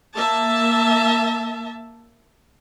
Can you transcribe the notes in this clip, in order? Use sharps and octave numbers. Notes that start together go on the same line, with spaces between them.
A#3 E5 A5